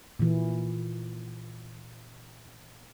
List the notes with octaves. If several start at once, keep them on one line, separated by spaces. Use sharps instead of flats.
A#2 E3